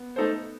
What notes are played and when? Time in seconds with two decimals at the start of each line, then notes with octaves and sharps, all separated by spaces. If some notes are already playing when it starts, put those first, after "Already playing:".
Already playing: B3
0.16 A3 D#4 A4 C5